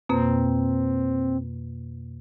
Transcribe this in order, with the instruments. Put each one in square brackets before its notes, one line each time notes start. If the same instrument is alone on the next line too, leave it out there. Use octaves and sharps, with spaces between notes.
[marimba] F2 B2 A#3 [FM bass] C4